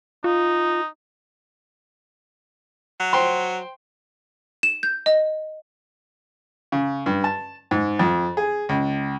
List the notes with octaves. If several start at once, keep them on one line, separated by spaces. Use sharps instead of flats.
D#4 F4
F#3
C5 G5 C6
E7
G6
D#5
C#3
G2
A5
G#2
F2
G#4
C#2